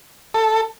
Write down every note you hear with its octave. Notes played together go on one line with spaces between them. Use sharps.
A4